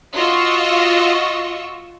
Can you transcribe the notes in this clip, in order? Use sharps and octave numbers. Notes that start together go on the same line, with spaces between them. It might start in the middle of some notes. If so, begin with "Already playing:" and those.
F4 F#4 D#5 C#6 E6